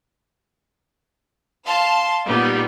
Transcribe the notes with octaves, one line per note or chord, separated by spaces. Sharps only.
F5 A5 C6
A#2 G3 B3 D#4